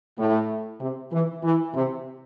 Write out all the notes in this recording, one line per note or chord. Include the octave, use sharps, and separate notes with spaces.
A2
C3
E3
E3
C3